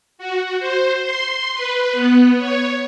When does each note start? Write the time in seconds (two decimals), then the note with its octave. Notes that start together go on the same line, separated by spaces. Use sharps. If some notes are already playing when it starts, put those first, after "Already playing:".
0.18 F#4
0.60 C5
1.03 C6
1.55 B4
1.93 B3
2.39 C#5